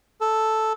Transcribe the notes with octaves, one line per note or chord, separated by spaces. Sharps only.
A4